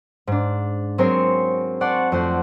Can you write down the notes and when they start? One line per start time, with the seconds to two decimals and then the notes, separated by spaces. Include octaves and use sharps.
0.27 G#2 D4
0.98 F#3 C4 G#4 A#4 C5 C#5
1.81 C5 D5 F#5 A5 C#6
2.12 F2 A3 C5 F#5